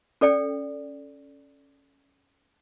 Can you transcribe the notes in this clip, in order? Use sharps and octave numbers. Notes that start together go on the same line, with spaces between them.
C#4 A4 D5 G5